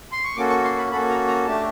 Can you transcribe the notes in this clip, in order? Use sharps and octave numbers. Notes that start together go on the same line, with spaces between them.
C6
C#6
A#3 C#4 F#4 A4 D6
C#6
C6
B5
A#3 C#4 F#4 A4 B5
A#5
A#5
A3 D4 G4 A5